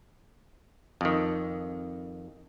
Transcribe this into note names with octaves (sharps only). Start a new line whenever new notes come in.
F2 D#3